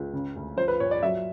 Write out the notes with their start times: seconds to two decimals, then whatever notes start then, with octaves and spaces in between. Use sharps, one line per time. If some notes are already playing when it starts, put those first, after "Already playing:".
Already playing: C#2
0.13 C#3
0.36 D2
0.57 F3 C5
0.68 B4
0.80 A#2 C#5
0.91 D5
1.03 F#3 E5